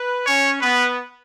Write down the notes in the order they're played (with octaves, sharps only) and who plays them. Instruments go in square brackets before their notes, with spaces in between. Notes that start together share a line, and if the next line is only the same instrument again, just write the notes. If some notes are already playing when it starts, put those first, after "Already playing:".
Already playing: [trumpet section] B4
[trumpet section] C#4 [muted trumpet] C#5
[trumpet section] B3 [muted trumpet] B4